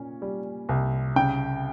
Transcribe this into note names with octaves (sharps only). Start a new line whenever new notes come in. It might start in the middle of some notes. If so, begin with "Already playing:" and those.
Already playing: A#2 C#4
G3
C2
C#3 G5